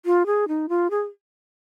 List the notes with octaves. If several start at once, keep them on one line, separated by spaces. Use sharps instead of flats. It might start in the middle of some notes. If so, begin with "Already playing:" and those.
F4
G#4
D#4
F4
G#4